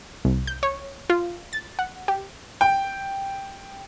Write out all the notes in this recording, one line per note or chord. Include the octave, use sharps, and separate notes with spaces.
C2
G6
C#5
F4
A6
F#5
G4
G5